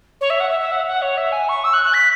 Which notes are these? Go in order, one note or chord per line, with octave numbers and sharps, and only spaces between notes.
C#5
E5
F#5
E5
E5
F#5
F#5
C#5
E5
G#5
C#6
E6
F#6
F#6
B6